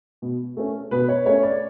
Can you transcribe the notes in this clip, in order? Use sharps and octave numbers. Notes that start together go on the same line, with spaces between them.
B2
A3 C#4
B2 B4
C#5
A3 C#4 C#5
D5